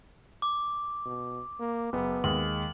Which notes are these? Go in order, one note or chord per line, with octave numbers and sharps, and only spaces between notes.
D6
B2
A#3
F#1 B3
D#2 G#3 F#7